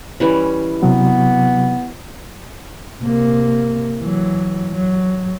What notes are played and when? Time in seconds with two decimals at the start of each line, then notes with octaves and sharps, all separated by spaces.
0.20 E3 G3 C#4
0.83 C3 F#3 B3
3.02 C3 A#3
4.01 E3 F#3
4.73 F#3